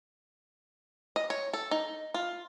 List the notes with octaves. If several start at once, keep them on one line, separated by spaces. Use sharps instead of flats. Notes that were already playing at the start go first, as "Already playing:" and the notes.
D#5
C#5
A4
D#4
F4